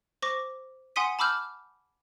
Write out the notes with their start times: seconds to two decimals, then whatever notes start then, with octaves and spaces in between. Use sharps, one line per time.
0.22 C5 C#6 D6 A#6
0.96 F#5 G#5 C6 D#6 B6 D#7
1.19 A5 B5 D6 E6 F6 G6